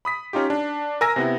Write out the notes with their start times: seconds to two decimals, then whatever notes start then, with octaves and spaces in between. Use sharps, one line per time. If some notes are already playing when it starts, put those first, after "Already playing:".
0.05 B5 D#6 B6
0.33 C#4 D#4 F4 G4
0.50 D4
1.01 A#4 G#5 E6 A#6
1.16 C3 B3 E4